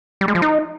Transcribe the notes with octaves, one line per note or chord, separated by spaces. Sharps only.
G3
G#3
F3
D#4